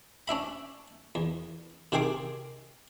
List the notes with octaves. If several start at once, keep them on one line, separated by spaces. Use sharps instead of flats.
C#4 D4 E5 B5
E2
C3 D#3 G4 G#4 C6 D6